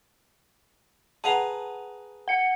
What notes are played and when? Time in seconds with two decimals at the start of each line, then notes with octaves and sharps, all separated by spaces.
1.24 G#4 B4 F#5 A5 A#5
2.28 F#5 C#7